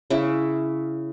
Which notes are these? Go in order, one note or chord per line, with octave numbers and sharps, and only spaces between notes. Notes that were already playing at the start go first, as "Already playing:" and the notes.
C#3 E4